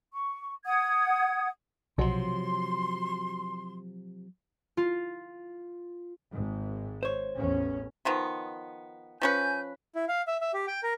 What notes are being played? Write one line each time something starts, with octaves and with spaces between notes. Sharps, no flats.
C#6
F#5 D#6 G#6
B1 C3 F3 F#3 C6
F4
G#1 G#2
C5 C#5
A1 E2 C#4
D#3 F3 B3
F3 C#4 B4 G#5 G6
E4
F5
E5
E5
G4
G5
A#4